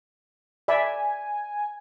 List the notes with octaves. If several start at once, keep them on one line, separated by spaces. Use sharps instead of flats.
D5 E5 G#5 B5